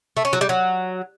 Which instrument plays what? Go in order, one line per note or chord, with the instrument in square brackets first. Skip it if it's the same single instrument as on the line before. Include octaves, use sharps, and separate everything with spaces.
[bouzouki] A3
C#4
F#3
G3
F#3